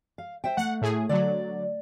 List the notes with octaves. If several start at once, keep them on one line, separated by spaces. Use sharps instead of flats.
F5
C5 E5 G5
A3 F#5
A2 G#4
D3 F#3 D5